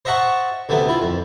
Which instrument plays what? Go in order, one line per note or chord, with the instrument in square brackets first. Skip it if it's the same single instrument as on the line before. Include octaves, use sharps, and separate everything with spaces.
[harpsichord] C5 D#5 E5 F#5 A5 C#6
D2 C3 A3 B3
E4 F4
F2